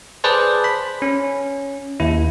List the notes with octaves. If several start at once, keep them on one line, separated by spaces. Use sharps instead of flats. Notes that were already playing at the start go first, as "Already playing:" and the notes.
G#4 B4 C5 D5 A5
B5
C#4
D#2 E4